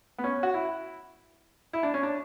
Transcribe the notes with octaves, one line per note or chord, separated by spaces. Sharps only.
B3
C#4
F#4
E4
E4
D4
C#4
D4